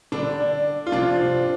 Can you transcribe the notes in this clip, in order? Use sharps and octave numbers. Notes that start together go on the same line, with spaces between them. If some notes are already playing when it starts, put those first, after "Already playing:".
D3 G3 D4
F4
C3 F3 D4